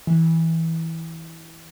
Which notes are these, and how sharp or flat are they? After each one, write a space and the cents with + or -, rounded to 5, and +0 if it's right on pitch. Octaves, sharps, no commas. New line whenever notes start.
E3 -15